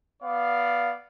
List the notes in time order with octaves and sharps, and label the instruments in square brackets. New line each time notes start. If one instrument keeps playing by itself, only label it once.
[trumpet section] B3 D5 F5